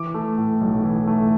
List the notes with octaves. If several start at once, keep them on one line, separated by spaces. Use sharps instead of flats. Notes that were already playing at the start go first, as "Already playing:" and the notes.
Already playing: E3 D6
A3
A2
B1
E3
A3